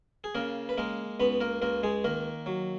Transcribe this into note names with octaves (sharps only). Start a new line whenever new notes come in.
G#4
C#3 A#3 A#4
B4
G#3 A#3 A#4
C#2 B3 B4
A#3 A#4
C#2 A#3 A#4
G#3 G#4
D#3 A#3 A#4
F#3